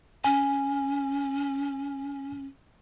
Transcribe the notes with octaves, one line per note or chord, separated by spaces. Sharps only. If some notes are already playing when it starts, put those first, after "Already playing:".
C#4 G#5